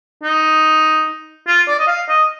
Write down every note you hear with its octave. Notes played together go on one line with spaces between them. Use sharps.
D#4
F4
D5
D#5
F5
D#5